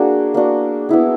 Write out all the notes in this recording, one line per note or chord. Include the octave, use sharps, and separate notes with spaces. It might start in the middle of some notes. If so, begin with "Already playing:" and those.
Already playing: A#3 D4 F#4 G#4
A#3 D4 F#4
B3 E4 G#4